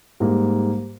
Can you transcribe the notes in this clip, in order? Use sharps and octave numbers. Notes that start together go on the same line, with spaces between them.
G#2 G3 A#3